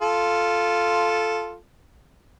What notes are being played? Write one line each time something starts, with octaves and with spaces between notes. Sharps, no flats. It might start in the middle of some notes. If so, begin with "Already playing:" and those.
F4 A4